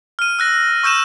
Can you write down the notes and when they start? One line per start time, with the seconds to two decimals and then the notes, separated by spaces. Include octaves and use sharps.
0.19 F6 D#7
0.39 E6 F#6 A#6
0.83 C#6 E6 G6 D#7 E7